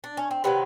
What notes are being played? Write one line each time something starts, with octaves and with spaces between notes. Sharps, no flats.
D4
C#4
C4
C3 D#3 F#3 B3